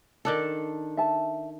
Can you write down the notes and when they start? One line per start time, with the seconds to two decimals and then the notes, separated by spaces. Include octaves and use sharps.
0.25 D#3 D4 A4
0.97 E5 A5